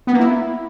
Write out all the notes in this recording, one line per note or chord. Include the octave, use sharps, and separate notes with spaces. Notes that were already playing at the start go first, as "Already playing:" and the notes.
B3
A#3
E4